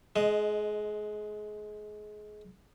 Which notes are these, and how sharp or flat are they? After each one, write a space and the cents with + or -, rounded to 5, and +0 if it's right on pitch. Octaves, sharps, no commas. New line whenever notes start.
G#3 +25 C5 -5 D#5 +0